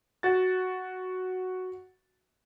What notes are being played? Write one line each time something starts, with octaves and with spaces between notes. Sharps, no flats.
F#4 A6